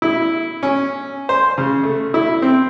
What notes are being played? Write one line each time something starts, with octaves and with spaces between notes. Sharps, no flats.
E4
C#4
C5
C#3
A3
E4
C4